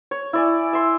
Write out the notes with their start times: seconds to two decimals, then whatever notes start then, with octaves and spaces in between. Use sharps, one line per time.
0.11 C#5
0.33 E4 D5 G#5
0.73 E5 C6